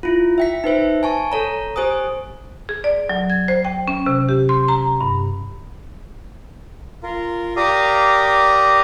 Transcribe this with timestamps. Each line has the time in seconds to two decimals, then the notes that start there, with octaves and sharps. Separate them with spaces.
0.03 E4 F4
0.38 E5 G5 B6
0.64 D#4 B4 C5 E5
1.03 G#5 A5 C#6
1.32 A4 C#5 A#5
1.76 G4 C5 G#5 D#6
2.69 G#4
2.84 D5
3.09 F#3
3.30 G#6
3.48 C5
3.65 G5
3.88 C#4
4.06 C3
4.29 G4
4.49 C6
4.68 A#5
5.01 G2
7.03 F4 A#4
7.56 G4 A#4 D5 F5 A#5 D#6